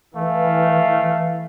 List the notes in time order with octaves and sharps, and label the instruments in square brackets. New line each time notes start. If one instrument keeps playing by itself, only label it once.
[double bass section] E3 [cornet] A3 [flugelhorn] F5